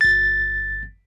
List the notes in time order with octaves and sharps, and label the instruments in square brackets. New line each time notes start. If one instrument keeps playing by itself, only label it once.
[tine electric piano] G1 A6